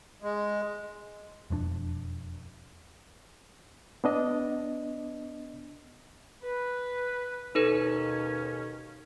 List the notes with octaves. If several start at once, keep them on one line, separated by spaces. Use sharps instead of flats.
G#3
E1 F2 G3 D4
B3 D4 D#5
B4
D#2 B2 C#4 D#4 A4 B4